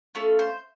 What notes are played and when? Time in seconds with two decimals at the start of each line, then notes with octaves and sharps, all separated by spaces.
0.15 A3 C#4 F4 A4
0.39 C5